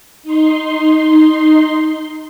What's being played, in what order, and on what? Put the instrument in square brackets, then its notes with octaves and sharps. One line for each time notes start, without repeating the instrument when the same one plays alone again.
[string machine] D#4 C6